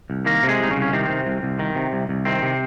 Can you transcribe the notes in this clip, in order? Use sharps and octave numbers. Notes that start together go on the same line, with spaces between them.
C2
D#3 A#3 A#4
C3
G#3 G#4
C2 D#4
C#3 C#4
C2
C#4
C3 D#3 C4
C3
C2
C2
D#3
C3
C2
C2
C3 D#3 C4
C3